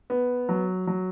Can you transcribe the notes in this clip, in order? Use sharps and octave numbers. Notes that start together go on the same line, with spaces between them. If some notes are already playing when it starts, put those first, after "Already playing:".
B3
F#3
F#3